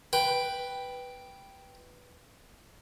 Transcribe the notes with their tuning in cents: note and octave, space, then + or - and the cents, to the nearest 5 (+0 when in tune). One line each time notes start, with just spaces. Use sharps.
B4 +0 G5 +0